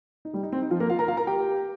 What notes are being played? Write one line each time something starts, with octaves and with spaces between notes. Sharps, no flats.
D#4
G3 G4
D#4
C4
D#4
F3 F4
A#3 A#4
F4 F5
A#4 A#5
F4 F5
A#4 A#5
G4 G5